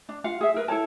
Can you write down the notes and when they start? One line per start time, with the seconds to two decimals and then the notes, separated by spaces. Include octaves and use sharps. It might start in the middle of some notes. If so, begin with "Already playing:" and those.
0.09 D4
0.24 F4 F5 F#5
0.41 G#4 E5
0.54 E4 A#4 B4
0.68 E4 A4 C#5 A5